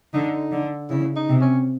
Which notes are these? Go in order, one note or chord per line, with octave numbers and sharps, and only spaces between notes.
D3 D#4
D3
C#3 E4
D#4
C3
C#4